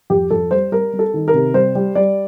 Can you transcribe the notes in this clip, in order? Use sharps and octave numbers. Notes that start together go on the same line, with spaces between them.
F2 G4
F2 A4
G3 C5
G3 A#4
G3
A4
D#3
A#4
C3
G3 C5
G3
G3 D5